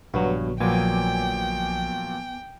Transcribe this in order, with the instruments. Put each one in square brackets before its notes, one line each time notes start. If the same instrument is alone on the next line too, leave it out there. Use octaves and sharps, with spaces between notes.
[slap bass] A#1 D3 [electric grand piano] G2 [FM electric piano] F#3 B3 F#4
[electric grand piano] A#2 F3 F#3 [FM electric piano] B3 G#5 D6 [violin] G5